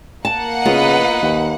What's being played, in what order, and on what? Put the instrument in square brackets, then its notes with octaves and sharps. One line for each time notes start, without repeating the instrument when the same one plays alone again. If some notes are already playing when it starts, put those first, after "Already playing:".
[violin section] A#3 F#5 [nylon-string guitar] A5
[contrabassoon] C#3 [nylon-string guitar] B3 F4 [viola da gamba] B4 D#5
[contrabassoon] D#2